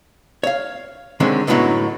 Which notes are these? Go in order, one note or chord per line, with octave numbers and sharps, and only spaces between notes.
C#5 F5
D3 D#3 G#3 C4 C#4
F#2 A2 D3 F#3 B3 D#4